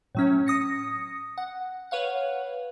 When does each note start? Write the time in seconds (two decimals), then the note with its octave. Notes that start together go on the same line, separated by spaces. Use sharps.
0.15 A2 F#3 C#4
0.46 D#6 A#6 C#7
1.38 F#5
1.91 B4 C#5 F5 F#5